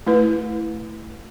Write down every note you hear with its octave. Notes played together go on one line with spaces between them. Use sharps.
A3 E4 B4